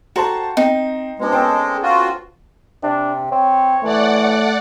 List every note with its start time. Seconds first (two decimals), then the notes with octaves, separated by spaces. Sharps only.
0.16 F#4 A4 C5 G5 A5 A#5
0.57 C4 D#4
1.19 B2 G#3 C4 D4
1.32 C#4 A4 C5 G5
1.83 F4 F#4
2.83 C3 D4
3.32 C4 C#5
3.84 E3 A3 D5 F#5